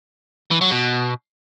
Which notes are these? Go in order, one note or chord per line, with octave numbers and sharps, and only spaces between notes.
E3
F#3
B2